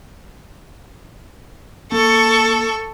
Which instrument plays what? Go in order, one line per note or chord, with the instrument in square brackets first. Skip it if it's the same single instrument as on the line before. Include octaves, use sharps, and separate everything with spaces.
[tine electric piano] A#3 [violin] A4 C#6